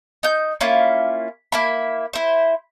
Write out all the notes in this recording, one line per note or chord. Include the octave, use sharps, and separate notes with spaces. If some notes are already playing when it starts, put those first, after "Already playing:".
D#4 G6
A#3 C#4 E4 F4
A#3 E4 B5
E4 C5